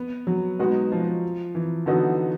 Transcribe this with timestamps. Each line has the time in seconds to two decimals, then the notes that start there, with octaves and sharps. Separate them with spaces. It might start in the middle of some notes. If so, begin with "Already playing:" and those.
Already playing: B3
0.27 F#3
0.59 B2 G#3 B3 D#4 F#4
0.92 F3
1.55 E3
1.86 D3 F#3 B3 D#4 F#4